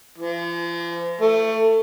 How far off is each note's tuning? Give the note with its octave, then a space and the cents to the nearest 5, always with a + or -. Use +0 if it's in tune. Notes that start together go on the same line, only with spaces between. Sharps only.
F3 -40
A3 +20